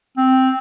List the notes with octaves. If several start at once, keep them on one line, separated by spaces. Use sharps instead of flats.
C4